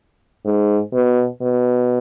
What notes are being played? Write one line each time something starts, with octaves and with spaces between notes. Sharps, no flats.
G#2
B2
B2